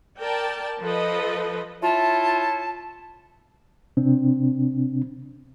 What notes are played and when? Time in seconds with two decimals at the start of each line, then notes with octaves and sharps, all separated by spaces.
0.19 A#4 D5 G5 A5
0.81 F3 A4 B4 D#5
1.82 E4 F4 C#5 E5 A5
3.97 C3 C4 D4